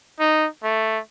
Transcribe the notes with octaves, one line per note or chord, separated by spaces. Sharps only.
D#4
A3